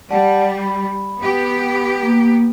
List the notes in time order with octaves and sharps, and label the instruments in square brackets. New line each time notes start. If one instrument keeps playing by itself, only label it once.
[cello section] G3 [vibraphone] D5 F#5 A5
[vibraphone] B5
[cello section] B3 G4
[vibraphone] A#3